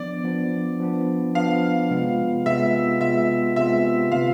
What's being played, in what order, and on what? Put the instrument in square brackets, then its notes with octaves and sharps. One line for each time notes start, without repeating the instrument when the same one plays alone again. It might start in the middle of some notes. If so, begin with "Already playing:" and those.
Already playing: [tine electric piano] F3 B3 D4 [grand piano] D5
[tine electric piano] F3 B3 D4
F3 B3 D4
[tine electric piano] F3 B3 D4 [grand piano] F5
[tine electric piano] C3 G#3 B3 F4
[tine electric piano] C3 G#3 B3 F4 [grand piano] E5
[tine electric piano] C3 G#3 B3 F4 [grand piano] E5
[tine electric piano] C3 G#3 B3 F4 [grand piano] E5
[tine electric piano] D3 A3 C4 F4 B4 [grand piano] F5